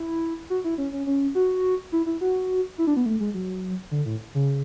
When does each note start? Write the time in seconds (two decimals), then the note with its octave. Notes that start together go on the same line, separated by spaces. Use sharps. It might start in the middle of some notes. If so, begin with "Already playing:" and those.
Already playing: E4
0.50 F#4
0.64 E4
0.78 C#4
0.92 C#4
1.07 C#4
1.35 F#4
1.92 E4
2.06 E4
2.21 F#4
2.78 E4
2.87 D4
2.96 B3
3.06 A3
3.20 G#3
3.34 F#3
3.91 D3
4.05 A2
4.34 C#3